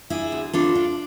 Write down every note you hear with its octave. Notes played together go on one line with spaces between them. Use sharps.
D4 E4 G#4
D2
D4 F4 A4
D4